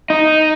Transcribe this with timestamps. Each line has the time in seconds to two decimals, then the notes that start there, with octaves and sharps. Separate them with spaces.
0.10 D#4